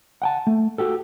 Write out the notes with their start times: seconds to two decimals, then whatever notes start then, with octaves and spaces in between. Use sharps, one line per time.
0.22 F#5 G5 A5
0.47 A3
0.78 F#4 G4 A4